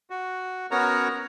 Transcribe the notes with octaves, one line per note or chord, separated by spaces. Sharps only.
F#4
B3 C#4 F#4 A#4 C#5 A#5